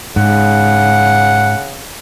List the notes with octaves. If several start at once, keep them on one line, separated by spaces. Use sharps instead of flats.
G#2 C#3 F#5